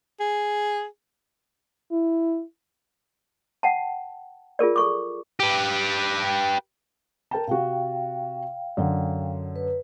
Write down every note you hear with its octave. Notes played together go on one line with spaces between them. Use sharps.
G#4
E4
F#5 G5 A5
F4 G#4 A#4 D5
A4 C#6 D6
G4 B4
A#4 G5 A5
C3 F#4 F5 G5
F#2 D3
B4